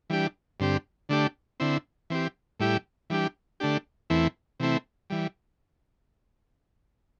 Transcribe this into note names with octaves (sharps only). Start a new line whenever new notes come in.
E3 G3 D4 G4
G2 D3 C4 G4
D3 A3 D4 G4
D3 C4 E4
E3 C4 G4
A2 G3 E4 G4
E3 G3 D4 G4
D3 A3 D4 G4
E2 E3 A3 C4 E4
C3 E3 A3 C4 E4
E3 G3